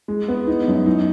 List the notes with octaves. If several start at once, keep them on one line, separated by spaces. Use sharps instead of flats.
G#3
B3
D#4
F#2
D#4